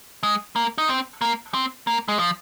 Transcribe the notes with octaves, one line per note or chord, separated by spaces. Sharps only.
G#3
A#3
D#4
C4
A#3
C4
A#3
G#3
F3